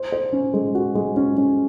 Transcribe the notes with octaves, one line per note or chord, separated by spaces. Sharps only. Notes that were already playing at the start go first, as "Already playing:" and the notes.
Already playing: C5
C5
C#4
G#3
F#4
G#3
C#4
C#4